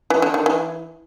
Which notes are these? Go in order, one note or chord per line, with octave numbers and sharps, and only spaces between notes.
E3
D3
D#3
E3